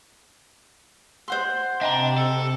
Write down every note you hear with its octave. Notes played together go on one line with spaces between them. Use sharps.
C5 F#5 C6
C3 D4 D#5 G5 A#5
A4